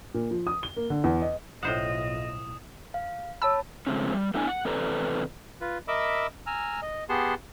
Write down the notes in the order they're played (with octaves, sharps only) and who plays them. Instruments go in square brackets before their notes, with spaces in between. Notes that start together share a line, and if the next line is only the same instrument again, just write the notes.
[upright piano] A#2
F3
D#6
G7
A#3
D3
E2
D#5
[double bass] B1 [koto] A2 C5 F#5 [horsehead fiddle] F4 D#5 [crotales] D#6 E7
[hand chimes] F5
[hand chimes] C#5 A5 B5 [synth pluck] E6
[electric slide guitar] C#3 F3 G#3 A3 C4 C#4
G3
A3 B3 D4 E4 D5 G#5
F#5
E2 C3 A4 B4 D5 A#5
[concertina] F4 B4
A#4 D#5 E5 B5 D6 E6
G#5 A#5 E6 F6
D#5
B3 G4 G#4 F#5 A5 C6